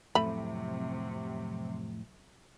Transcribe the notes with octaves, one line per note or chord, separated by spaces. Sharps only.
F2 A2 C3 F#3 A3 B5